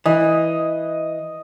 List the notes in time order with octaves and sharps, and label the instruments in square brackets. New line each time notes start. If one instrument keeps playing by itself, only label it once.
[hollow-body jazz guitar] E3 [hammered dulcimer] D#5